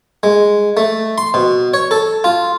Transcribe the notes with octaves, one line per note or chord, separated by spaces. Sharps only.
G#3
A3
C6
B2
C#5
A4
F4